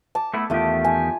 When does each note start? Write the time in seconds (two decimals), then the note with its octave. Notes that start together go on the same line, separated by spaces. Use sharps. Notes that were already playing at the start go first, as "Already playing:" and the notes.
0.15 A5 D6
0.34 A3 B3 E4
0.50 E2 D#3 A3 F4 G4
0.84 G#5